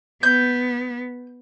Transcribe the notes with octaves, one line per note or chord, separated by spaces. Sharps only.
B3 G6